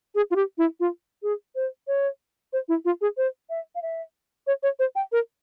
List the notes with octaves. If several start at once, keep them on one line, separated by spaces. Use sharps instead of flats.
G#4
F4
G4
E4
F4
G#4
C5
C#5
C5
E4
F4
G#4
C5
E5
F5
E5
C#5
C#5
C5
G5
A#4